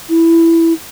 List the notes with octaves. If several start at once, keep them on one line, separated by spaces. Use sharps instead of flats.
E4